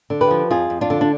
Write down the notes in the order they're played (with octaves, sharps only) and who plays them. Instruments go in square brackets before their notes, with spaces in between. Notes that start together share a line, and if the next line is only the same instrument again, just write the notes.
[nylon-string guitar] D3
G4 B4
F3
F2 F4 G#4
F2
D4 F4
D3
D4